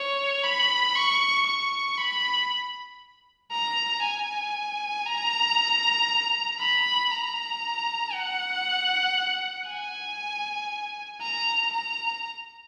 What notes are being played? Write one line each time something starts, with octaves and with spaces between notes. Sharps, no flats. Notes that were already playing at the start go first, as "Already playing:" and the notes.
Already playing: C#5
B5
C#6
C#6
B5
A#5
G#5
A#5
B5
A#5
F#5
G#5
A#5
A#5